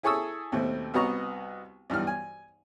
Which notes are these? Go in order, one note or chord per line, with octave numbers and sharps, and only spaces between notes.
E4 G#4 A4 C#6 D#6 E6
D#2 B2 A3 C4
C2 B3 F#4 D#5 A#5 C#6
B1 G2 E3 F6
G#5